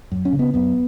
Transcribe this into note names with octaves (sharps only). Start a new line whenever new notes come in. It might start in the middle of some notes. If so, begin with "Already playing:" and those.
F#2
C#4
C#3
B3
F#2 B3